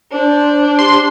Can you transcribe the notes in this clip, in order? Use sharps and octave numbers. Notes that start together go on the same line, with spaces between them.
D4 C5
G4 C6